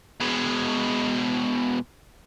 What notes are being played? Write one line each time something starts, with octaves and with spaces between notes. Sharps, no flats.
B2 G#3